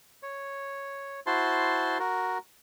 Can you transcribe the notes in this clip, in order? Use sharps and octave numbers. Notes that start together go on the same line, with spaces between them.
C#5
E4 F#4 C5 A5 C6
F#4 A#4